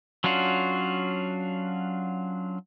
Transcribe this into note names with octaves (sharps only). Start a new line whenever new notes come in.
F#3 C#4 D4 F4 F#4